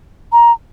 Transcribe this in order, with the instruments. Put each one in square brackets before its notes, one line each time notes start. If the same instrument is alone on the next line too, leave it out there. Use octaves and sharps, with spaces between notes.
[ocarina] A#5